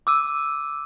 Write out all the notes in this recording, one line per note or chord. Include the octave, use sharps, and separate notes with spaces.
D6 E6 D#7